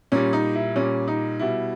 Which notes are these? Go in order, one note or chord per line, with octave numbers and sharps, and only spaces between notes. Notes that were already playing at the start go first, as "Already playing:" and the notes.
A#2 G3 C#4
D#4
E4
A#2 G3 C#4
D#4
B2 G3 E4